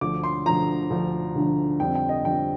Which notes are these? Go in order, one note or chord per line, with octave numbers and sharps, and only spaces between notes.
D2 D3 F3 D6
C6
D2 D3 F3 A#5
D2 D3 F3
D2 D3 F3
F2 D3 G3 C4 G5
G5
D#5
F2 D3 G3 C4 G5